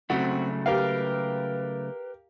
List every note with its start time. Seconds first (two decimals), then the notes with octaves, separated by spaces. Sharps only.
0.10 C#3 F#3 A3 C4 F#4
0.66 G4 A#4 B4 F5